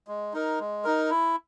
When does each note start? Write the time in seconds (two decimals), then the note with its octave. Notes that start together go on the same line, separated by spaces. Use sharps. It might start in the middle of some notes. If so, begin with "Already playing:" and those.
0.08 G#3
0.33 D#4 A#4
0.59 G#3
0.84 D#4 A#4
1.10 E4